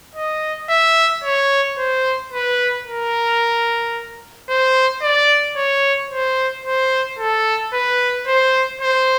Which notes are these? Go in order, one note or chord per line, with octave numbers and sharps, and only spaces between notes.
D#5
E5
C#5
C5
B4
A#4
C5
D5
C#5
C5
C5
A4
B4
C5
C5